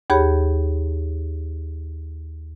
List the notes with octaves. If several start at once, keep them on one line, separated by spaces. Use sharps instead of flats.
D#2 G4 G#4 C#5 B5